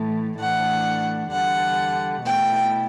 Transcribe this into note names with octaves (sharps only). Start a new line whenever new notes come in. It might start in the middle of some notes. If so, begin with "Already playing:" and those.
Already playing: A2 E3 A3
A2 E3 A3 D4 F#5
E2 D3 G3 F#5
B2 A3 E4 G5